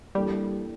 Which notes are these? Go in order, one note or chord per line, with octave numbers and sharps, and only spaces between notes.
E3 G3 A#3 D4 A4